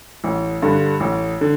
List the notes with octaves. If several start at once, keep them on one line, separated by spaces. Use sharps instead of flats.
A1
G2 D3
A1
D3